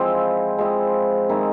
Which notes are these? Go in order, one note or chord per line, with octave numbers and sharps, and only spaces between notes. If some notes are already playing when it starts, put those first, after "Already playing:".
Already playing: F3 G#3 C4 E4
F3 G#3 C4 E4
D#3 G#3 C4 E4